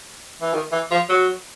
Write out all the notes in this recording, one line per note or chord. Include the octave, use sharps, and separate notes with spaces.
E3
D#3
E3
F3
F#3